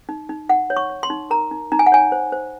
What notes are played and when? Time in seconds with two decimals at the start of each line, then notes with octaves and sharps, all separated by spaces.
0.09 D#4
0.29 D#4
0.49 D#4 F#5
0.70 C#5
0.77 C#6
0.90 C#5
1.03 C6
1.10 D#4
1.30 A#4 A#5
1.51 D#4
1.72 D#4 A#5
1.79 G#5
1.86 F#5
1.92 C#5 G#5
2.12 C5
2.32 C5